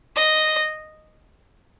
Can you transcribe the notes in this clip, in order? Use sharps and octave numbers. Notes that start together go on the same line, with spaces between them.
D#5